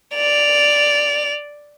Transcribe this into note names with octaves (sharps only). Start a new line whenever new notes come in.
D5 F7